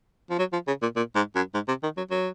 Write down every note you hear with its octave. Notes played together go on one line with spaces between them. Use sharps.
F3
F#3
F3
C#3
A#2
A#2
G#2
F#2
G#2
C3
D#3
F#3
F#3